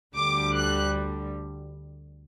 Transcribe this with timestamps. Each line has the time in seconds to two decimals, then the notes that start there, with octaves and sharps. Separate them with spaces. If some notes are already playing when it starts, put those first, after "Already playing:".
0.15 D2 D3 G3 D6
0.56 F#6